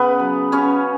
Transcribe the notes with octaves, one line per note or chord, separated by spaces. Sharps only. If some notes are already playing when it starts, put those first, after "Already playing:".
Already playing: C#3 B3 B4
F#3
C#3 C#4 C#5